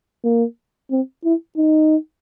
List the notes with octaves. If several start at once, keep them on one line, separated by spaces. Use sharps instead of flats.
A#3
C4
E4
D#4